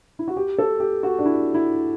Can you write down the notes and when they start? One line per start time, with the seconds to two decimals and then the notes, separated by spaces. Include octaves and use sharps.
0.19 E4
0.28 F#4
0.37 G4
0.58 A4
0.80 G4
1.03 F#4
1.19 D4
1.26 E4
1.54 E4